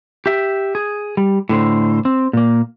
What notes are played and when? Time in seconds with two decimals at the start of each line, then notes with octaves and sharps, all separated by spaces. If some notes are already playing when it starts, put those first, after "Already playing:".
0.26 G4 E5
0.75 G#4
1.17 G3
1.49 A2 D3 C5
2.05 C4
2.33 A#2 A#3